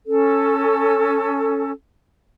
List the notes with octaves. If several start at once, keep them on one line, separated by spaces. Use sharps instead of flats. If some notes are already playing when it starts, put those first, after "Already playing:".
C#4 A4